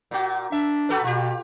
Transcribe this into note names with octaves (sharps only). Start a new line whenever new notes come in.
A#2 F#4
D4 E5
F#4 A4 B4
B2 F4 G4